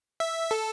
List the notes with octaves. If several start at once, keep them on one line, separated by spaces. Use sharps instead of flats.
E5
A4